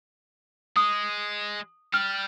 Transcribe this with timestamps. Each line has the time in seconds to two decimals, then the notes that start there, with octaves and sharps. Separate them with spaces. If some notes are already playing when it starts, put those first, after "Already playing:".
0.76 G#3 D#6
1.93 G3 F6